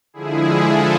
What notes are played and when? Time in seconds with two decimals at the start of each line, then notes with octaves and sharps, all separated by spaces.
0.14 D3 F3 G#3 E4 G#4
0.65 F4 A4